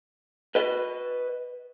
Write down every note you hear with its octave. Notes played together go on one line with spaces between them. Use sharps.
B4 D#5